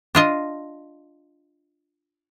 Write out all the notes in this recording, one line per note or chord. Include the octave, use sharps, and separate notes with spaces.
D4 F4 D#5